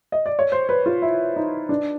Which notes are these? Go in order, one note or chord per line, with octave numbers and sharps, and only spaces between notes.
D#5
D5
C#5
C5
B4
F4
E4
D#4
D4